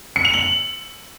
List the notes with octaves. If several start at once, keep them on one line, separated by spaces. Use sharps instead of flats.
C#7
F7
F#7